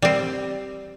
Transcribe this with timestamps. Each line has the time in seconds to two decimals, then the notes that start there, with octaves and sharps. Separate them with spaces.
0.02 G3 C4